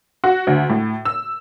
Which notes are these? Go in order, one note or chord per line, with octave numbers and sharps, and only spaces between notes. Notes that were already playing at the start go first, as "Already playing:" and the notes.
F#4
D2
A2
E6